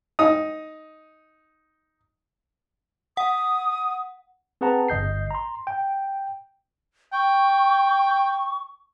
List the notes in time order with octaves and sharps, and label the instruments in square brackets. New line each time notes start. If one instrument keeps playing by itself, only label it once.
[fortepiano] D#4 D#6
[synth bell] F#5 [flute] D#6
[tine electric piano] C4 G#4 B4 F#5 A5 A#5
G1 D#5 G6 C7
A#5 C6
G5
[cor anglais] G5 [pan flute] C#6